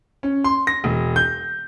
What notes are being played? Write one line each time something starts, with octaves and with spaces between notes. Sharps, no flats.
C#4
C6
A#6
E1
G6